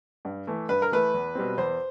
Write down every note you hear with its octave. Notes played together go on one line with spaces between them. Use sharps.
G2
E3 A3
G2 B4
A#4
E3 A3 B4
E2
B2 G3 C4
E2 C5